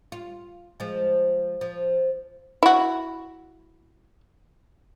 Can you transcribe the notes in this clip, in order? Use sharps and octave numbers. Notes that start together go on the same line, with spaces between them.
F4
F3 G#3
F3
E4 F#4